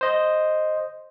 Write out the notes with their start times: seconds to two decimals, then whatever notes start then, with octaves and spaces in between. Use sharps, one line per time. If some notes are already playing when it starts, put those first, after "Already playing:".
0.01 C5 D#5